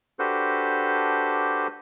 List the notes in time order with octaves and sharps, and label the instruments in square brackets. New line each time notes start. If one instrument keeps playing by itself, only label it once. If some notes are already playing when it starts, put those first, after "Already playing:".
[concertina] D4 F#4 G4 A4 B4 C5